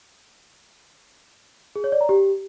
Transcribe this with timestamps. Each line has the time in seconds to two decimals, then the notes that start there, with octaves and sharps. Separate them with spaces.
1.76 G#4
1.84 C#5
1.92 D5
2.01 A#5
2.09 G4